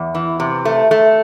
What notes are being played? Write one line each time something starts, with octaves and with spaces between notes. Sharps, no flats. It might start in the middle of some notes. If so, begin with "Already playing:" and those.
Already playing: E2
E3
C3
A3
A3